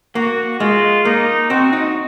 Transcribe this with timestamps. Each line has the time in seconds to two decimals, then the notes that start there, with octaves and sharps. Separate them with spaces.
0.15 A#3 F#4
0.60 G#3 F4
1.05 A#3 D#4
1.50 C4 F#4
1.73 D#4